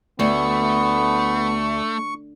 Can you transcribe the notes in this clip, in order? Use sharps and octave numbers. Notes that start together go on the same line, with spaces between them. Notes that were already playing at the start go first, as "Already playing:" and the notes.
D2 A3 B3 C#6